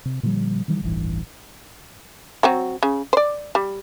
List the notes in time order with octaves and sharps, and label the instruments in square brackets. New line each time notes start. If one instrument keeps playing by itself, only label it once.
[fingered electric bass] C3
A#2 D3 F3 G3
D#3 E3 G3
D#1 A1 G2 E3
[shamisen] F#3 C4 F#4
C#3
C5 D5
G3